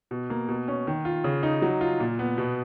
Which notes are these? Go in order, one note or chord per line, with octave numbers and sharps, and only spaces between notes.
B2
A#3
B2
C#4
D#3
F4
C#3
D#4
F#3
F4
A#2
B3
B2